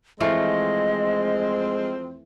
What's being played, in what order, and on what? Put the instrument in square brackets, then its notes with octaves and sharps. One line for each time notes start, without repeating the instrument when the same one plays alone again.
[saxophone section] F2 C4 [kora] E3 A3 F4 [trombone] G#3 [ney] D#5